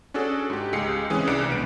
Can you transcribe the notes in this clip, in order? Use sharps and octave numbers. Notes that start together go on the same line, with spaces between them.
C#4 D4 F#4 G#4 A4
G#2 G4
C#2 G#3 G4 C7 C#7
E3 G#3 C4 C#4 G#4
C2 D4 C#7 D7
B1 B3 D7